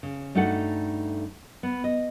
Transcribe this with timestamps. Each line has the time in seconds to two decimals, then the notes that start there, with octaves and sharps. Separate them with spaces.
0.03 C#3
0.35 G2 A3 D#4 F#4 A4 F#5
1.63 B3
1.84 D#5